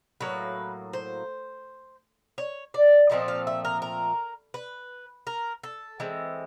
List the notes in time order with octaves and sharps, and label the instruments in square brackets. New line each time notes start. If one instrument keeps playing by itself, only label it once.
[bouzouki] A2 F#3 A#3 B4
C5
C#5
D5
A#2 F3 A3 C4 D#5
F5
E5
A#4
A#4
B4
A#4
A4
E3 G#3 C4